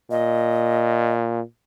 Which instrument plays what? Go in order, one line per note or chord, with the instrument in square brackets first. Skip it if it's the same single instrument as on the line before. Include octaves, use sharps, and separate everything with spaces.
[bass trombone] A#2 [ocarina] D#5